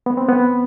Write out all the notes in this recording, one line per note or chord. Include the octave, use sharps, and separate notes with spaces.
B3
C4
B3